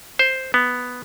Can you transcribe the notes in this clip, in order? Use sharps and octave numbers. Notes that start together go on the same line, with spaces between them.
C5
B3